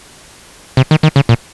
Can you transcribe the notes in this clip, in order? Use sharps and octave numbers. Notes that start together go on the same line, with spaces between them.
C3
D#3
D#3
C#3
A#2